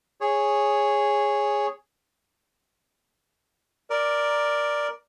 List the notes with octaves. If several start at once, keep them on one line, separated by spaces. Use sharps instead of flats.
G#4 C#5
A#4 D5